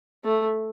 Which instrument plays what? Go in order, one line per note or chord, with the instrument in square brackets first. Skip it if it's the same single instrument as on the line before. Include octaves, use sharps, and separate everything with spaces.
[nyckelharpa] A3